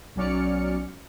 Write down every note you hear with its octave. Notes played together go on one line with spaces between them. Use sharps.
B1 F#3 C#4 D5 F6 C#7